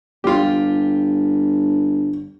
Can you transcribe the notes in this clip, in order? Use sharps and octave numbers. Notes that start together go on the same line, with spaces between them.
G1 F4 G4